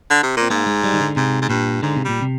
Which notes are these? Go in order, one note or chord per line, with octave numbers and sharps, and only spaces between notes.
D3
C3
A#2 C4
G#2 A#3
G#3
G3
D#3
D3
G#2 C3
G#2
G2 A#2
G#2 D3
C3
A#2 G3
C3